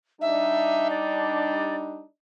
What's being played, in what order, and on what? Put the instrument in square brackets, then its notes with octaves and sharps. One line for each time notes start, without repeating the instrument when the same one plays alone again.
[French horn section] G3 D4 D#4 [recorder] E5
[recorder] D5